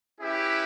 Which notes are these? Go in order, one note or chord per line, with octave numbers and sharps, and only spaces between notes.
C#4 E4 G4 B4 E5